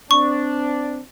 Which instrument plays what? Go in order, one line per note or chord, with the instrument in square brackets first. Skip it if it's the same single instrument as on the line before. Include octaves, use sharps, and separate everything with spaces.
[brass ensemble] C4 D4 [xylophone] C#6